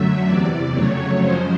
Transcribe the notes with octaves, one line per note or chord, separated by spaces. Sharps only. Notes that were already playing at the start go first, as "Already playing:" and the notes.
Already playing: F#2 D3 F#3 A3 E5
E2 C3 E3 D5
F2 C#3 F#3 A3 C#5
F#2 C#3 F3 G#3 C5